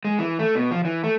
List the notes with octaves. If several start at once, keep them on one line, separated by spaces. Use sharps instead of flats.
G#3
E3
A3
B2
F3
E3
A3